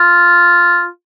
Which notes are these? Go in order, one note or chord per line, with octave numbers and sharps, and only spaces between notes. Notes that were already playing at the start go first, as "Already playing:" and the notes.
Already playing: F4